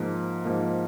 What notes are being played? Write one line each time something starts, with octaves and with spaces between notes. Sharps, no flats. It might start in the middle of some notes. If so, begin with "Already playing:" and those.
Already playing: G#2 F3 A#3
G#2 F3 A#3